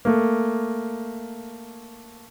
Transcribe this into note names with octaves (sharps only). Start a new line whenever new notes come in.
A3 A#3